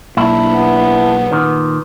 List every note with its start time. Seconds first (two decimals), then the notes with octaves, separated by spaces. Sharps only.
0.17 B1 A#3 D4 E4
0.54 B3
1.32 A#2 D#3